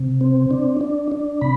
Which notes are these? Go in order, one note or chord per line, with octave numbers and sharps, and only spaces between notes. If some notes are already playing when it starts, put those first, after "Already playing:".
Already playing: C3
C4
D4
D4
D4
C3 B5